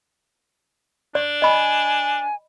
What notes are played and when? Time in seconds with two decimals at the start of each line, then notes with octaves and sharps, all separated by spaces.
1.15 D4 D5
1.42 D#5 G#5 B5